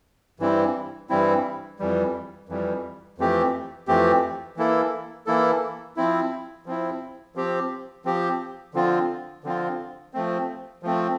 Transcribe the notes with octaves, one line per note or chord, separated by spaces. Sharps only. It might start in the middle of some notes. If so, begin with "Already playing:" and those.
G2 E3 G3 C4 E4
G2 E3 G3 C4 E4
F2 E3 G3
F2 E3 G3
F2 E3 A3 C4 G4
F2 E3 A3 C4 G4
E3 A#3 E4 A4
E3 A#3 E4 A4
F3 C4 E4
F3 C4 E4
F3 C4 G4
F3 C4 G4
D3 F3 C4 F4
D3 F3 C4 F4
F3 A3 C4
F3 A3 C4